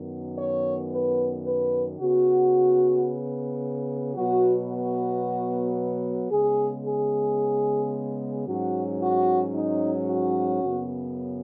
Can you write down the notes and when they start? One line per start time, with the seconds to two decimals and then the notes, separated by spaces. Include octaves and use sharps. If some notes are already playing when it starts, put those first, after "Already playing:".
Already playing: F#2 D#3 B3
0.38 C#5
0.91 B4
1.46 B4
2.00 C#3 B3 F#4
4.15 B2 F#3 B3 F#4
4.69 F#4
6.31 C#3 G#3 B3 G#4
6.85 G#4
8.46 G#2 F#3 C#4 F#4
9.01 F#4
9.54 D#4
10.09 F#4
10.63 F#2 C#3 B3